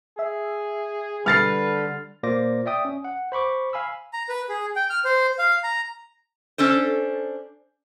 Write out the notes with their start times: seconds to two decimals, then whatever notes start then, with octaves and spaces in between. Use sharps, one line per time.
0.19 G#4 E5
1.26 D3 G3 B4 F6 A6 C7
2.23 A#2 A#3 C5 D5 D6 A#6
2.66 D5 E5 G5 D#6
2.85 C#4
3.04 F#5
3.32 C5 B5 C#6 D6
3.73 F5 G#5 B5 E6
4.13 A#5
4.29 B4
4.49 G#4
4.76 G5
4.90 F6
5.05 C5
5.39 F5
5.64 A#5
6.58 C#4 D4 A4 C5